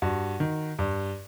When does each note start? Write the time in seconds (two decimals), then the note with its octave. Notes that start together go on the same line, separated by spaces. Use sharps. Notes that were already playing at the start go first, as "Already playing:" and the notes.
0.02 G2 F#4
0.40 D#3
0.79 G2